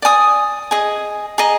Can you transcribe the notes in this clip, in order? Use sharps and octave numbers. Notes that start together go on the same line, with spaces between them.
D5 G#5 D#6
G#4 D#5 G#5
G#4 D#5 A#5